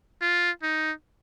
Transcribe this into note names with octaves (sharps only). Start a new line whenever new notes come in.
F4
D#4